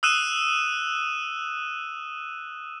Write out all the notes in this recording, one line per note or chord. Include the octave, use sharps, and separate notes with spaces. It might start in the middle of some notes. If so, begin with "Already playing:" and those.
D#6 E6 F#6 D#7 E7